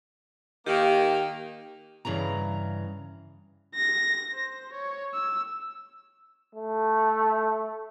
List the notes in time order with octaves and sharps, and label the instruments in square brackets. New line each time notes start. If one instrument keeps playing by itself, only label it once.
[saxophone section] D#3 A#3 [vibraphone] G4 G5
[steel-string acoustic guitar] G2 C#3 E3 A#5
[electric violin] A#6
C5
C#5
E6
[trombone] A3